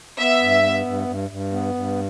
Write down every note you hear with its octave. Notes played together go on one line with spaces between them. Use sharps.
B3 E5
G2
B3
G2
G2
G2
B3
G2